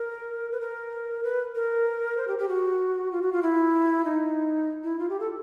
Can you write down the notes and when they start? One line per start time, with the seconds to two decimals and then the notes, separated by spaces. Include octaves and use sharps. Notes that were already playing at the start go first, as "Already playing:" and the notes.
Already playing: A#4
0.52 B4
0.61 A#4
1.24 B4
1.55 A#4
2.17 C5
2.28 G4
2.39 G4
2.49 F#4
3.12 F4
3.22 F#4
3.32 F4
3.42 E4
4.05 D#4
4.84 E4
4.99 F4
5.09 G4
5.20 A4